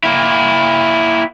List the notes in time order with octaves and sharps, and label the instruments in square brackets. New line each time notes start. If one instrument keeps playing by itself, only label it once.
[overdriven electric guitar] A#3 E4